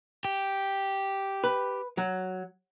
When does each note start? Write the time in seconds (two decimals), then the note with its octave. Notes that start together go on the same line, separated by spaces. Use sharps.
0.25 G4
1.44 B4
1.97 F#3